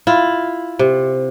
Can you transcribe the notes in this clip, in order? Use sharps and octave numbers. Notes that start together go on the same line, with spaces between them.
E4 F4
C3